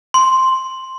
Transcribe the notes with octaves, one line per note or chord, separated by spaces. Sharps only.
C6